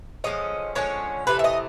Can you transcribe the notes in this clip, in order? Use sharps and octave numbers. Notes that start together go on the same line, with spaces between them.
D3 F3 G#3 C#4 D#5
D3 F3 G#3 C#4 C#5
C3 E3 A3 B4
E5
D#5